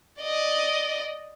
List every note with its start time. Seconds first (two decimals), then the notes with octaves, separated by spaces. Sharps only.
0.21 D5 D#5